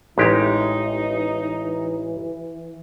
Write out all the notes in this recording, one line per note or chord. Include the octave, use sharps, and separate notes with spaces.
A1 E3 G#3 D#4 G4